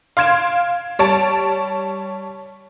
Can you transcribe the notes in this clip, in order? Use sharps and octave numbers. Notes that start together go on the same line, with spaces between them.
F5 C6 F6 G#6 D7 E7
G3 C#5 A5 D7